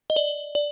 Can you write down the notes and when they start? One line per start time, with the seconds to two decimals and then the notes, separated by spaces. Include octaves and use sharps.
0.10 D#5
0.16 D5
0.55 D5